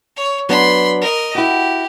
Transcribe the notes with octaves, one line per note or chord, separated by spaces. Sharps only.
C#5
F#3 B3 D4 B5 C6
A#4 D#5
E4 F#4 G4